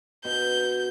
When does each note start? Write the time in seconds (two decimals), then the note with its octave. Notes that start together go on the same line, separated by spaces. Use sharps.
0.25 B2 G6